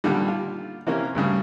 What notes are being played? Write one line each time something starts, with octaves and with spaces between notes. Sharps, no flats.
B1 A#2 D3 D#3 G3
F4
C3 E3 A#3 C#4
D2 G2 C#3 G3